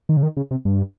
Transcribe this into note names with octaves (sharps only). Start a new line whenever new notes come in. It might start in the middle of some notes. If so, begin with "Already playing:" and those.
D#3
C#3
D#3
C#3
C3
G2